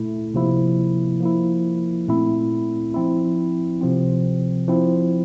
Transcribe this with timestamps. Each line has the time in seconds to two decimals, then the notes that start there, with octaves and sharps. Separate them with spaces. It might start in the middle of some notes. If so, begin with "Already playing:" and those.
Already playing: A#2 A3 E4
0.34 C3 F3 A#3 E4
1.20 F3 A#3 E4
2.08 A#2 A3 C4 E4
2.94 F3 C4 E4
3.81 C3 F3 C4
4.68 F3 C4 E4